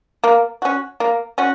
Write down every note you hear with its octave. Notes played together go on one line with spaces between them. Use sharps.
A#3
C#4 F#4
A#3
C#4 F#4